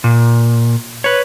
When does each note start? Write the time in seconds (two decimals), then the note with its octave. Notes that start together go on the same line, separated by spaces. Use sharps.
0.04 A#2
1.04 B4 C#5